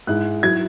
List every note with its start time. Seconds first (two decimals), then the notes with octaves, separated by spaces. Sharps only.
0.07 G#2 G#3 E4 F#6
0.43 F#3 E4 G#6